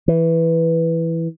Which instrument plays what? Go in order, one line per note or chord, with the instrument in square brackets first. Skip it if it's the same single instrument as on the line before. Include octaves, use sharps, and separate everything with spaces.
[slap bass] E3